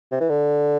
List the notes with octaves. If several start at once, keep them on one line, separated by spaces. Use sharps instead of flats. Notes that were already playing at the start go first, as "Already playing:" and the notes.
C3
E3
D3